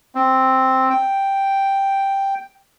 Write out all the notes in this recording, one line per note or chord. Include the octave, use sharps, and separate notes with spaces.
C4
G5